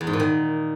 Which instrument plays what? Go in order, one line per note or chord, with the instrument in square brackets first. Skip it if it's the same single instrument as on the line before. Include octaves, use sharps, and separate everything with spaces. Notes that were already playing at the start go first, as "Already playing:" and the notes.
[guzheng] E2
G#2
A#2
D#3